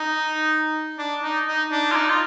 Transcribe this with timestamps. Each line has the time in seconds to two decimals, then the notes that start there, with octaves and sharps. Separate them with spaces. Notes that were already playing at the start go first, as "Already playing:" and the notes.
Already playing: D#4
0.98 D4
1.23 D#4
1.47 D#4
1.72 D4
1.91 F4
1.96 D#4
2.10 F4